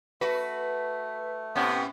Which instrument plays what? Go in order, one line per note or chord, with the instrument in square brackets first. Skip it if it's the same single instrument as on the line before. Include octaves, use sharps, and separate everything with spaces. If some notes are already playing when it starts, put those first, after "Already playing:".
[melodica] A3 [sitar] F#4 [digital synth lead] B4
[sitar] A2 C#4 [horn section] C3 B3